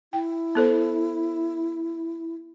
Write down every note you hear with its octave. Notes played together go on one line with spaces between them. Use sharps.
E4 G5
B3 A4 C5